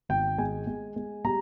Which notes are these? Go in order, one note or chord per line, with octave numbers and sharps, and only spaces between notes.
G#1 G5
G#3 G#5
G#3
G#3
G3 A#5